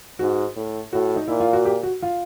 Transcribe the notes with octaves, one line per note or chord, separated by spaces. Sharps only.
G#2 F#4
A2
A2 F#4
D#4
A#2 E4
F4
F#4
G4
F#4
F4